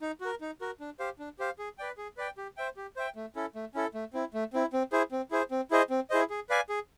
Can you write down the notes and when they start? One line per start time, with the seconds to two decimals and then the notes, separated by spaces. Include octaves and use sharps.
0.01 D#4
0.21 F#4 A#4
0.41 D#4
0.61 F#4 A#4
0.80 D4
0.99 G4 C5 F5
1.19 D4
1.39 G4 C5 F5
1.59 G#4
1.78 B4 D5 G5
1.98 G#4
2.17 B4 D5 G5
2.37 G4
2.57 C5 E5 G5
2.77 G4
2.96 C5 E5 G5
3.16 A3
3.36 C#4 E4 A4
3.55 A3
3.75 C#4 E4 A4
3.94 A3
4.13 C4 E4
4.34 A3
4.53 C4 E4
4.73 C4
4.92 E4 G#4 C5
5.12 C4
5.31 E4 G#4 C5
5.51 C4
5.71 E4 G#4 C5 D#5
5.90 C4
6.10 E4 G#4 C5 D#5
6.30 G#4
6.49 B4 D5 F5 G#5
6.69 G#4